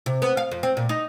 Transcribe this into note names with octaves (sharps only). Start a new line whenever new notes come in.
C3
B3
F5
F2
C4
A#2
D#4